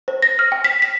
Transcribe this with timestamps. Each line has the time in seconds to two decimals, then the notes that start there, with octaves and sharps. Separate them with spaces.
0.08 C5
0.22 A#6
0.39 F6
0.52 G5
0.64 B6
0.82 B6